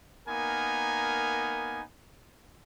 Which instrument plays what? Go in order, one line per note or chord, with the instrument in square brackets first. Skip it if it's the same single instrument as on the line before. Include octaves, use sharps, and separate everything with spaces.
[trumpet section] A#3 B3 D#4 A#4 G#5